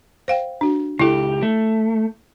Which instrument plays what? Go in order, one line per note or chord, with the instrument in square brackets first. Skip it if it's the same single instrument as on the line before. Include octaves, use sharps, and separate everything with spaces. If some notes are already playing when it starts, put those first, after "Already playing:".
[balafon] C5 F5 G5
D4 F#4
[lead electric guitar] C#2 G4 [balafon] E4 A4
[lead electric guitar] A3